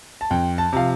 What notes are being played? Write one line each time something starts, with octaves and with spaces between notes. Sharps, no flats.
A5
F2 G5
A5
C3 F3 F5